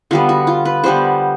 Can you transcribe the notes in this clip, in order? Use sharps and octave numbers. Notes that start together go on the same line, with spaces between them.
D3 G3 B3 F4
F#4
F4
B4
D3 G3 B3 C5